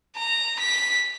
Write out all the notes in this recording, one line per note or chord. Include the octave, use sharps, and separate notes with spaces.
A#5
B6